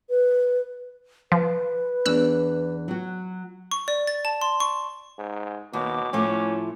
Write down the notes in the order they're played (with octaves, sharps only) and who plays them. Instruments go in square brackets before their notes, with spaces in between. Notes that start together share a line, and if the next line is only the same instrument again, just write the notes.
[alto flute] B4
[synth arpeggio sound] F3 [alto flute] B4
[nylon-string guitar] E2 C#4 D4 [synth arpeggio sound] E6 F#6
[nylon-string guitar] F#3 F#4
[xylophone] C#6
D5
A6
A5
C6
C#6
[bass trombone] G#2
[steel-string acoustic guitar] D#2 [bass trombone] B2 [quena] D6
[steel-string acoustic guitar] A2 F3 A3 [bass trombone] C#4